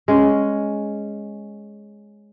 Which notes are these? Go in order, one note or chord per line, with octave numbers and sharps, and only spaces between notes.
G#3 C#4